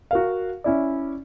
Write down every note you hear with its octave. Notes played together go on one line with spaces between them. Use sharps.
F#4 A#4 F5
C#4 E4 D5